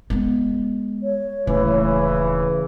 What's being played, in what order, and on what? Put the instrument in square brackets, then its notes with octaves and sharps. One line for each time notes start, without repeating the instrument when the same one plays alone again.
[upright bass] G#3 B3
[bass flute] C#5
[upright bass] D#1 A3 [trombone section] C#3 E3